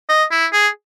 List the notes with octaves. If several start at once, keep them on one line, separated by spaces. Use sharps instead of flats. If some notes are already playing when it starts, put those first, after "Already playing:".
D#5
E4
G#4